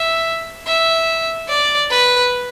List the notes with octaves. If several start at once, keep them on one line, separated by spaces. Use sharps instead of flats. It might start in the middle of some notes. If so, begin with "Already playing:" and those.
Already playing: E5
E5
D5
B4